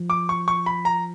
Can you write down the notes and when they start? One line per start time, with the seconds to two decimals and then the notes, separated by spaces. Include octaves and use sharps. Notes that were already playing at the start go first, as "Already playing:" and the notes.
Already playing: F3
0.10 D6
0.29 C#6
0.48 C#6
0.66 B5
0.85 A#5